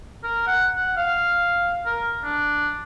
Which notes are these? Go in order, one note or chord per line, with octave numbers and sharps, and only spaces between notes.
A#4
F#5
F#5
F5
A#4
D4